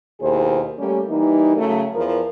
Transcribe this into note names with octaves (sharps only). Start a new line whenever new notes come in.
D#2 B2 E4 G#4 C5
G3 A3 A#3 C#4 G4
E3 G3 A#3 D#4
C#3 F#3 A3
E2 F3 E4 A#4